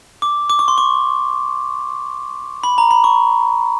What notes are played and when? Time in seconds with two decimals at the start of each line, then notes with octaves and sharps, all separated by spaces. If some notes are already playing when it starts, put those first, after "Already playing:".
0.22 D6
0.50 D6
0.59 C#6
0.68 C6
0.78 C#6
2.64 B5
2.78 A#5
2.91 B5
3.04 C#6